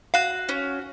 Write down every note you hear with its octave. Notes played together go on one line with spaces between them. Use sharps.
F#4 F5
C#4